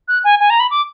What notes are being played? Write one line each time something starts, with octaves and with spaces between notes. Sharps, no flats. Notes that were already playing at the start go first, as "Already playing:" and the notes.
F#6
G#5
G#5
A#5
B5
D6